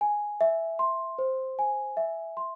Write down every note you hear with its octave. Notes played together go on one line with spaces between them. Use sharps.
G#5
E5
C6
C5
G#5
E5
C6